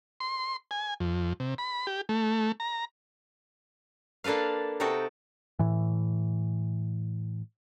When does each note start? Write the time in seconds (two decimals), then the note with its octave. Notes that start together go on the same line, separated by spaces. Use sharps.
0.20 C6
0.71 G#5
1.00 F2
1.40 C3
1.58 B5
1.87 G4
2.09 A3
2.60 A#5
4.24 A#3 D4 A4 B4 F5
4.80 C3 D#4 F#4 A4 G5
5.59 A2 E3